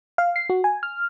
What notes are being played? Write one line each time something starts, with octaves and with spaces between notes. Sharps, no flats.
F5
C7
F#4
G#5
F6